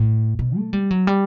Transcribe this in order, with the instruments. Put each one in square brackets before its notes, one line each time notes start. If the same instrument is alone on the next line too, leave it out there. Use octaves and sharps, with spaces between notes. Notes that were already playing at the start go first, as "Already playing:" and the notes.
Already playing: [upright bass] A2
B2
A3
G3
F#3
G3